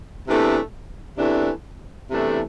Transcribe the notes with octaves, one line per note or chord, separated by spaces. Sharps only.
E2 C3 E3 A3 D4
E2 C3 E3 A3 D4
E2 C3 E3 A3 D4